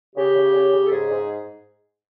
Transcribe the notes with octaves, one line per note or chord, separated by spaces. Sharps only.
C#3 G4
C#3
C#3
C#3
A4
G#2 G#4
G#2